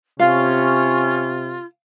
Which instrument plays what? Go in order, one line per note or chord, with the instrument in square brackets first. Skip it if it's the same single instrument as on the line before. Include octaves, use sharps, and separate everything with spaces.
[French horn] C3 [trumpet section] C#4 [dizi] F4 [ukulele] F5